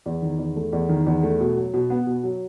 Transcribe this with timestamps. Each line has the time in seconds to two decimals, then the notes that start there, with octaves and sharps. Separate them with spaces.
0.06 E2
0.22 D#3
0.39 E2
0.56 A3
0.73 E2
0.89 D#3
1.06 E2
1.23 A3
1.40 B2
1.57 F#3
1.74 B2
1.90 B3
2.07 B2
2.24 F#3